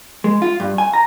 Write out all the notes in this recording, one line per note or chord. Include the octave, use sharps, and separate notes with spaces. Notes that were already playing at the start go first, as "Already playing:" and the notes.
G#3
F4
G2
G#5
A#5